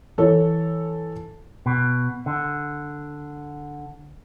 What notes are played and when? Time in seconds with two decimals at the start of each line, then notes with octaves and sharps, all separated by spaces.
0.18 E3 A4 C#5
1.66 B2
2.26 D3